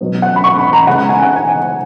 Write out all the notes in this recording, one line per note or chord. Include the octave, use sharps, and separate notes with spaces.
B2 F#3 B3
F#5
B5
C#6
B5
A#5
C#3 G#3 B3 F#5
G#5
F#5
G#5